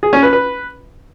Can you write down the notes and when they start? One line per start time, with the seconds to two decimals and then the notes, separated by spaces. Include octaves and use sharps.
0.03 G#4
0.13 C#4
0.23 B4
0.33 B4